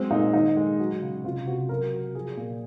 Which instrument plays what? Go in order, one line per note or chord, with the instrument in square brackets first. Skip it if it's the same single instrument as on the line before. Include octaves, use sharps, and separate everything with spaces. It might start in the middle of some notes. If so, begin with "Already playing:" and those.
Already playing: [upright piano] F#3 G#3 C4
A#2 D#4
D#3 D#4
G#3
F#3
C#3
C3 F4
C3 F#4
F#3 A#4
F#3
F3 G#4
A#2